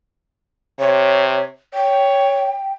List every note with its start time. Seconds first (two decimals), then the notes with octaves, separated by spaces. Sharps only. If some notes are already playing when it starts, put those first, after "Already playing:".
0.80 C3 C#5
1.74 C#5 G5